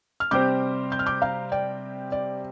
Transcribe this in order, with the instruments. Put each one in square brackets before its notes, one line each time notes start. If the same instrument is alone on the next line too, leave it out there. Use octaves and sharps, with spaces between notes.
[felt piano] F6
[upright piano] C3 G3 C4 G4 C5 [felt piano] D6 G6
[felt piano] G6
F6
D6 G6
F5 A#5
D5 G5
D5